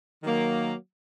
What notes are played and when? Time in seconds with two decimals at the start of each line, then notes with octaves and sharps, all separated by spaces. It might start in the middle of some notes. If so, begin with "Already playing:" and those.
0.23 D#3 F#3 A#3